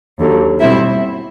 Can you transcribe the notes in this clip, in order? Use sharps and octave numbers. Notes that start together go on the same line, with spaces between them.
D#2 D3 F#3
B2 G3 C4 E4 E5